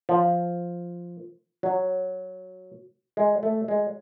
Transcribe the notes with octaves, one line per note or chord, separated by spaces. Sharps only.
F3
F#3
G#3
A3
G#3